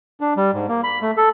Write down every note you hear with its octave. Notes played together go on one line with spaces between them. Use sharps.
D4
G3
G#2
A#3
B5
A3
A4